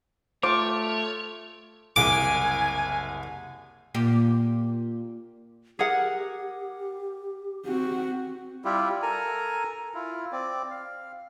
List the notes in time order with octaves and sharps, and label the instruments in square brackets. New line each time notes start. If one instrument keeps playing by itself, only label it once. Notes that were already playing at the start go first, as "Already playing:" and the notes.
[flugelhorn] A3 [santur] F4 [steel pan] C5 D6 [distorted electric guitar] C#5
[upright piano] F#1 C2 G#4 [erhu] G#5 [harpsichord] D6
[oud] A#2 G4
[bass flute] G4 [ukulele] G#4 A#4 F#5
[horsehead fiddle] C4 F#4
[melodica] G3 E4 F4 G4
A4 A#4 G#5 A#5
E4 F4
C4 D5
F5